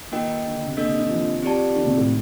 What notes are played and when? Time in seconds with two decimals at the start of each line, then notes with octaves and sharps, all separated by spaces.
0.12 D#3 A#3 F4 A#4 D#5 G5
0.44 D3
0.55 D3
0.67 C3
0.77 A#3 D4 A4 D#5
0.88 C3
0.99 D#3
1.10 F3
1.43 C4 G4 D5 A5
1.76 D#3
1.86 C3
1.97 A2